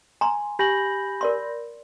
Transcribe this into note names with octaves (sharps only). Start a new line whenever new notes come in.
G#5 A#5 C6
G4 G#5 B5 G6 A#6 F#7
A#4 D5 C6